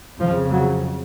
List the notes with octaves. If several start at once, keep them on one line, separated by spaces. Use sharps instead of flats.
F2 C#3 F3
F#3